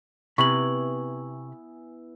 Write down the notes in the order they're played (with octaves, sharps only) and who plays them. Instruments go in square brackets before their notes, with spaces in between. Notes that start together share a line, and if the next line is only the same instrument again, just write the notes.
[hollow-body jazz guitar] C3 B5 [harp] B3 E4 G#5 [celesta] C#6 F#7